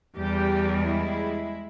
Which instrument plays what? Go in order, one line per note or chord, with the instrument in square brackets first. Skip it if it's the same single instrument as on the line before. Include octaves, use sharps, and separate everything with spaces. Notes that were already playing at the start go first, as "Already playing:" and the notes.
[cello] E2 G3 [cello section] G4
[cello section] G#3 E4